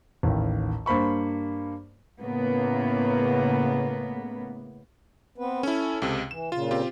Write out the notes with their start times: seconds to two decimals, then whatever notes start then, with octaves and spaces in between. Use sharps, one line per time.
0.23 A1 D#2 D#3
0.86 G2 A#3 C5 B5 C#6
2.21 A2 C#3 A#3 B3
5.38 B3 C4 B4
5.63 C#4 E4 A4
6.02 C#2 C3
6.31 E3 E7
6.52 A#2 C#3 F4
6.71 C4 F4 G4